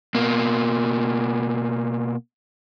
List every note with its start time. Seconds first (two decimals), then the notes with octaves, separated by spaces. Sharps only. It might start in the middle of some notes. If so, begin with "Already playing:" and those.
0.15 B2 A#3